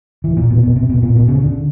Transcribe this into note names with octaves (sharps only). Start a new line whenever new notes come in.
E3
A#2
B2
B2
C3
B2
A#2
B2
C#3
D3